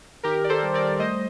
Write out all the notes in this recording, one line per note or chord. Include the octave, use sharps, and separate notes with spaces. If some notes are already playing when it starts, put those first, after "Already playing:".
D#3 G4 A#4
D5
A4 C5
G3
A#4 D5
A3 C5 D#5